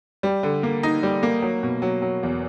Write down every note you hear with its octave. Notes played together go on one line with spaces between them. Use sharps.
G3
D3
A#3
D#4
G3
A#3
F#3
B2
F#3
F#3
E2